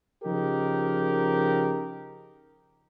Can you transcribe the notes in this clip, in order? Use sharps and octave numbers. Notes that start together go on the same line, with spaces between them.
C#3 F3 D#4 G4 A#4